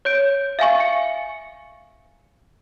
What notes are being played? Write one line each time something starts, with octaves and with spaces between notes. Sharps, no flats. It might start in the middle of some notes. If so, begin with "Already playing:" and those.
C#5 G6 D7
E5 F5 G#5 C#6
C#7